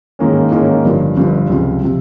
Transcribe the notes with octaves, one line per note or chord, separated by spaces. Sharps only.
G#2 D#3 A#3 C#4
G#2 D#3 A#3 C#4
G1 G2 F3
G1 G2 F3
C#2 C3 F3
C3 F3